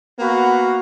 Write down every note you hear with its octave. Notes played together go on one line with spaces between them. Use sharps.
A#3 B3 F#4 F5 F#5 B5